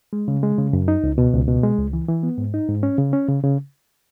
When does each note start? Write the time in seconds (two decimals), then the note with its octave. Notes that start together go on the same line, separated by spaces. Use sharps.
0.13 G#3
0.28 C#3
0.43 G#3
0.58 C#3
0.73 F#2
0.88 D#4
1.04 C#2
1.18 B2
1.34 C#2
1.48 B2
1.63 G#3
1.78 C#2
1.93 E3
2.08 E3
2.23 B3
2.38 G#2
2.54 D#4
2.68 G#2
2.83 C#4
2.98 C#3
3.13 C#4
3.29 C#3
3.43 C#3